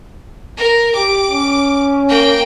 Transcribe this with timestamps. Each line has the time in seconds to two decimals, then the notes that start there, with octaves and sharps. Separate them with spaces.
0.57 A#4
0.95 G4 D6
1.30 C#4
2.09 A#3 G5